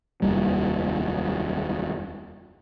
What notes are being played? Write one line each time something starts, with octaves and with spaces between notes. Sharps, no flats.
F1 D#2 G3